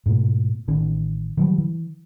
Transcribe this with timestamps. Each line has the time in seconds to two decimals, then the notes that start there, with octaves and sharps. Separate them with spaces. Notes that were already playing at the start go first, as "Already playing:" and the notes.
0.06 G#2 B2 A3
0.68 A1 D#3 C#4
1.37 D#3 F#3 G3
1.58 E3